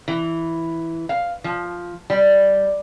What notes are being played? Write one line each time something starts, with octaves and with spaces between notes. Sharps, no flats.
E3
F5
F3
G3